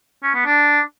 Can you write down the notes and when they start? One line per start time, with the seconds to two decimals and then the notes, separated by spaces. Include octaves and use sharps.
0.23 C#4
0.34 B3
0.45 D4